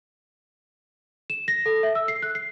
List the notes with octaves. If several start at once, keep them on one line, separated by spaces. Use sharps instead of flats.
E7
A#6
A4
E5
E6
C7
F#6
C7